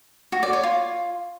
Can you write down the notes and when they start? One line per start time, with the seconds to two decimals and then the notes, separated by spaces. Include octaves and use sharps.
0.32 F#4
0.43 D5
0.53 C#5
0.63 F4